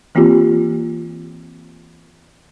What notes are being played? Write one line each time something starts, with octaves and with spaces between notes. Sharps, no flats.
E3 A#3 C4 F4 G4